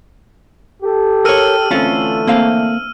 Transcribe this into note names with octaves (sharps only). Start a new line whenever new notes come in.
G4 A4
A#4 C#5 E6 F6 D#7
D3 E3 A3 C4 C#4 F4
A#3 C4 F5